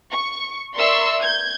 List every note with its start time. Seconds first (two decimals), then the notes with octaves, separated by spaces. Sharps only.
0.12 C#6
0.74 A#4 D5 E5 C6 C#6 E6
1.20 G6 G#6